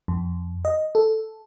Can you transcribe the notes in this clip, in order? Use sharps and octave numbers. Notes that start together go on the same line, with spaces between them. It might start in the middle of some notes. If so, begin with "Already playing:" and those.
F2
D#5
A4